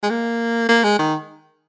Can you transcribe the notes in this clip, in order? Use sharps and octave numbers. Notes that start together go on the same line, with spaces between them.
G#3
A#3
A#3
G#3
D#3